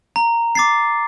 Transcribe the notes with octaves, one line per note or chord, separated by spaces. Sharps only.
A#5
D6 A6 C7